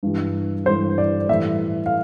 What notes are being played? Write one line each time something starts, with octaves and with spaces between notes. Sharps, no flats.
G2 E3 G3
G2 E3 G3 C5
D5
A2 E3 G3 E5
F5